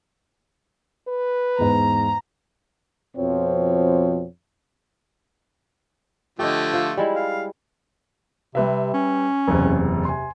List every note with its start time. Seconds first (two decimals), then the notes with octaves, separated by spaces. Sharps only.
1.08 B4
1.58 E2 G#2 A#5
3.17 F2 B2 F3 C4 C#5
6.39 D3 F3 A3 G4 C#5 D#5
6.73 F4 C5
6.97 G3 G#3 E4
7.15 F5
8.55 C3 G3 B4 E5
8.94 C#4
9.48 F#1 E2 C3
10.05 C3 G#5 C6